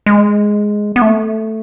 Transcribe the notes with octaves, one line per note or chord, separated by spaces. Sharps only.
G#3
B3
A3